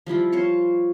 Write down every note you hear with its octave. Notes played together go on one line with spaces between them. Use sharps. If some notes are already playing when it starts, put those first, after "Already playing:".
F3 G3 E4 F4
C5 C#5 F5 C#6